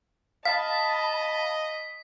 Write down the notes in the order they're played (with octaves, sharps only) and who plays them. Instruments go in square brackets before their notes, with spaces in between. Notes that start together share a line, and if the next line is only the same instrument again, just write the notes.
[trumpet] D#5 [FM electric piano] F5 [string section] A5 B5 [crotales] B6